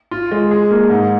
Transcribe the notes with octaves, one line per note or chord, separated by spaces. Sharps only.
F4
G#3
G#4
A#3
G#2